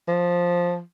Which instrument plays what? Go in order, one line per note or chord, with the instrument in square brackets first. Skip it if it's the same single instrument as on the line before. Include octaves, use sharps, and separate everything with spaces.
[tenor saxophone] F3